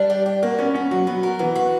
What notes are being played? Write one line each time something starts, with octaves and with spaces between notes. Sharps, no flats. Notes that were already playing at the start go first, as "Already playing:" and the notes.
Already playing: G3 D4
G4
G4
A#3 F#4
B3 C#4
B3 C#4
F#3 F#4
F#3 B3
A#4
E3 B3
F#4